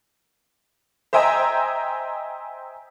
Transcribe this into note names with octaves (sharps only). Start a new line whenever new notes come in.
C5 D#5 E5 G5 G#5 A#5